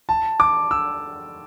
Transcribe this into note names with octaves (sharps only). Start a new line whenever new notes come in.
A5
D6
E6